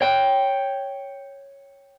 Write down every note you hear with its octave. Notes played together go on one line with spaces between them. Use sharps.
C#5 G5